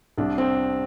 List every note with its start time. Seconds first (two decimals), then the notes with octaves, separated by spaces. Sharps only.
0.18 C2 D4
0.38 C4